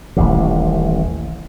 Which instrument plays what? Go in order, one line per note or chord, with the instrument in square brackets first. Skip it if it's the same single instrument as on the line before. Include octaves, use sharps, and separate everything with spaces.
[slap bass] D#1 A1 C3